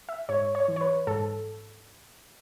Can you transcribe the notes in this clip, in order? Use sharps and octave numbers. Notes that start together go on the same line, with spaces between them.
E5
G#2 C#5
C#5
E3
C#5
B4
G#2 A4